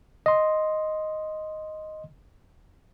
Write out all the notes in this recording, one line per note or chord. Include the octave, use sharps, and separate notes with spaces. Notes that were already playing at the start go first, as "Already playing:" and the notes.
D#5 C6